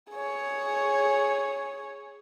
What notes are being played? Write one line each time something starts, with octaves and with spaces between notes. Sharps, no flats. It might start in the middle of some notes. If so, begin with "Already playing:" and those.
G#4 C#5